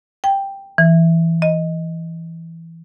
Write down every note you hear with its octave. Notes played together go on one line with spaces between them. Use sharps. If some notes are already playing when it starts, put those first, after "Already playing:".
G5
E3
D#5